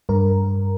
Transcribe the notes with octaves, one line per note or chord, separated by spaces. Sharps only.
G2 A#4